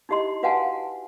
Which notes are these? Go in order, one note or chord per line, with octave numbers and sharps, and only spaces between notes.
D#4 E4 G4 D#5 C6
F#4 B4 F5 F#5 G#5 A5